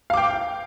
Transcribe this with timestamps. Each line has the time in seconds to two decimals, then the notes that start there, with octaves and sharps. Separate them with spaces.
0.10 F5
0.14 D6
0.17 G5